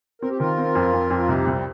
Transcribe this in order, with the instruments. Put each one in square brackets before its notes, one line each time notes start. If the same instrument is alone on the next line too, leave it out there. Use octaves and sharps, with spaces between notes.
[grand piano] C4 [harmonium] A#4
[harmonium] G4
[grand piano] D#3 [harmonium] F4 A#4
[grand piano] C4
F2
F2
F2
[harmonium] F4
[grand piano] C2 [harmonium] D#4 G4
[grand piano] C2 [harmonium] G3 C4